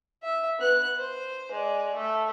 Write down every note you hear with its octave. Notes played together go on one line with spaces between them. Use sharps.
E5
B3 F#6
C5
G#3 D5
A3